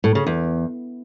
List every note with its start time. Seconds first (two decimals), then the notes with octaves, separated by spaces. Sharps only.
0.04 A2
0.15 C#3
0.27 E2